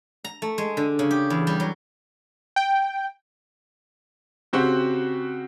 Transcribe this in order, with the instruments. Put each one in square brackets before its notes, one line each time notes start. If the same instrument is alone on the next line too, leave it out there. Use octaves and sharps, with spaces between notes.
[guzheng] A#5
A3
G#3
D3
C#3
G4
E2
G3
F#3
[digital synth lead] G5
[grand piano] C#3 C4 F#4 G4